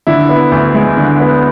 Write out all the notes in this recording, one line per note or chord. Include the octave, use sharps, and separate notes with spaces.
D3 E4
B3
D2
G#3 E4
D3
B3